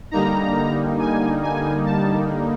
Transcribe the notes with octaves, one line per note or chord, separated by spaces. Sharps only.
D3 G3 A#3 D#4 A#5
G#5
G#5
A5